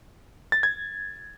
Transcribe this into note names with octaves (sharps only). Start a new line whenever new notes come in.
A6
G#6